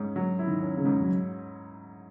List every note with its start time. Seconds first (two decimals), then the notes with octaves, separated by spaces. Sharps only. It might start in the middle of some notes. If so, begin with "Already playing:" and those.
Already playing: G#2 C#4
0.16 F#3
0.39 E4
0.47 D#3
0.62 C#4
0.77 C#3
0.85 G#2
1.02 F#3